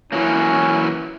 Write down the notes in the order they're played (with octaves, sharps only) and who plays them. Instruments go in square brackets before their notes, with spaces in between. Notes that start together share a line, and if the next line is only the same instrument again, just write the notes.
[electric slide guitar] E3 F#3 A#3 [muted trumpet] C#4 [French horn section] E4